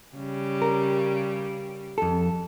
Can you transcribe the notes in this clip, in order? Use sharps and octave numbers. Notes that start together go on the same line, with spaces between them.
C#3 G3
A#4
F2 A4